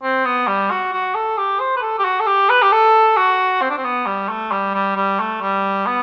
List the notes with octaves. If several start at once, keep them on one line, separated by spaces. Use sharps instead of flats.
C4
B3
G3
F#4
F#4
A4
G4
C5
B4
A4
G4
F#4
A4
G4
B4
G4
A4
F#4
C4
D4
C4
B3
G3
A3
G3
G3
G3
A3
G3
B3